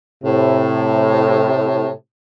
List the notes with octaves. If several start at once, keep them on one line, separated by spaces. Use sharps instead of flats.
A2 C3